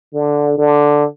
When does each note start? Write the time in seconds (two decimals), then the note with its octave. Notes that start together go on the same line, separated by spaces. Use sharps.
0.14 D3
0.58 D3